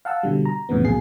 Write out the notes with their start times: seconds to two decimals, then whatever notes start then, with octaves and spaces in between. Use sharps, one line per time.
0.05 F5 F#5 A5 E6
0.23 B2 D3 G3
0.45 A#5
0.69 F2 A2 C#3 E3 B3
0.84 B1 B2 A#3 G#4 C7